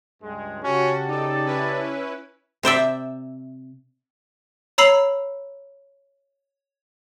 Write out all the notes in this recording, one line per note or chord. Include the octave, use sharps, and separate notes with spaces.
C#2 G2 G#3
C#3 C#4 F#4 G4 A5
D#4 A4 D5
C#4 E4 B4
C3 C5 D5 E5
C#5 A#5 B5 E6 C7 F#7